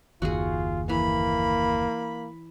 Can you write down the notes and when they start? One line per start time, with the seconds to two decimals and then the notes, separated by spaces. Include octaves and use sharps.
0.22 F#1 D#2 F4 F#4 G#4
0.89 E3 A#3 B5